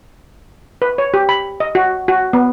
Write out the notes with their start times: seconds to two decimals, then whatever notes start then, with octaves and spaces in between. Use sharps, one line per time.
0.82 B4
0.98 C#5
1.14 G4
1.29 B5
1.60 D#5
1.75 F#4
2.08 F#4
2.33 B3